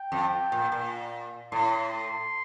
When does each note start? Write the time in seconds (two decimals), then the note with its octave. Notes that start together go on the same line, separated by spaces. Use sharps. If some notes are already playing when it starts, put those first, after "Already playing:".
Already playing: G5
0.12 F2
0.52 A#2
0.72 A#2
1.52 A2 C6